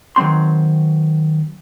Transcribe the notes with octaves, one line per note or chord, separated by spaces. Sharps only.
D#3 F#3 C4 C6